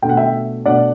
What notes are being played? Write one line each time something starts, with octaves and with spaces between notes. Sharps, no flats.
B2 A3 D4 G5
F#5
E5 G5
B2 A3 D4 D5 F#5